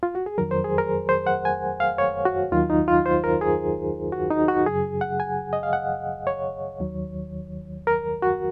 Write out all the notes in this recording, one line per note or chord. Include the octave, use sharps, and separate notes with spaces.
F4
F#4
G#4
F2 D#3 F#3 A#4
C5
G#4
A#4
C5
F#5
G#5
F5
C#5
F#4
D#2 D#3 F#3 F4
D#4
F4
C5
A#4
G#4
F#4
D#4
F#4
F#2 C#3 F#3 G#4
F#5
G#5
D#5
F5
F#5
C#5
D#2 D#3 F#3
A#4
F#4